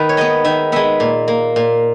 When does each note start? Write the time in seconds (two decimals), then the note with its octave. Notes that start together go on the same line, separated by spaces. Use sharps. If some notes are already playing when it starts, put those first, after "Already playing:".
Already playing: D#3 B4
0.09 C#5
0.17 G#3 B3 D#5
0.44 D#3 E5
0.72 G#3 B3 E5
1.00 A#2
1.28 A#3
1.56 A#2